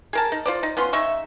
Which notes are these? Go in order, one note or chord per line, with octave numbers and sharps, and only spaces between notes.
G#4 A#4 A5
D#4
F4 C5 D5
D#4
B3 C#4 F4 C6
C#3 D#4 E5 C#6